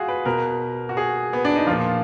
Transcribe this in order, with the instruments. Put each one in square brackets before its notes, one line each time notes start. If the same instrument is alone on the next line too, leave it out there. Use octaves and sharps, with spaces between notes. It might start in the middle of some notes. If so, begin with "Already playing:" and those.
Already playing: [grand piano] F4 F#4 G#4
B4
B2 A#4
F#4
G#4
B3
D4
D#4
A#2 F3 F4